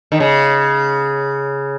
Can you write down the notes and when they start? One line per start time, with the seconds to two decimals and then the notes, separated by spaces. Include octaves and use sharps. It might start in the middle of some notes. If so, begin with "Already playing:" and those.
0.12 D#3
0.20 C#3